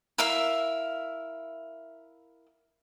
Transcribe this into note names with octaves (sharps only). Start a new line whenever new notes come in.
E4 A#4 E5 F5